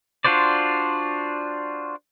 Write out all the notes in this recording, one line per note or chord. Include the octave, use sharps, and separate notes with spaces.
D4 F4 F#4 C5 D5